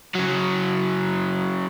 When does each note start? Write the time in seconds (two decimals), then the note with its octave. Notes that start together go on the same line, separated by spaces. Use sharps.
0.15 C#3 F#3